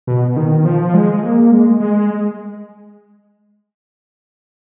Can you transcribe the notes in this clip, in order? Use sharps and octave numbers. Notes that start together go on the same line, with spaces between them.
B2
D#3
F3
G#3
A#3
G#3
G#3